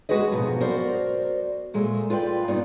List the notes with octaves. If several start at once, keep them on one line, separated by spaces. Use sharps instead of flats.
G#3 F#4 G#4 B4 D#5
F2 G#2 B2 F3 F#3
F#4 A#4 C5 D5
A#2 G#3 A3
F4 B4 D5 G5
G2 B3 D#4 F4 D5